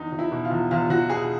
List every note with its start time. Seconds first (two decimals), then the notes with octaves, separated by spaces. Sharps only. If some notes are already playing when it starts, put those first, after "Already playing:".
Already playing: E2 D#4
0.12 E2
0.19 E4
0.32 B2
0.45 F4
0.51 E2
0.71 E2 F4
0.90 E2 F#4
1.10 B2 G#4